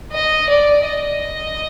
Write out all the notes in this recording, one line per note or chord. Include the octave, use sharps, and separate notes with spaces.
D#5
D5
D#5